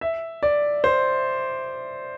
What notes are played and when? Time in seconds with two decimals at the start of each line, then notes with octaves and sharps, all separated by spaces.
0.01 E5
0.43 D5
0.84 C5